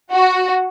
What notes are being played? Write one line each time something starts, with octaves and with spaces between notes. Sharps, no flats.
F#4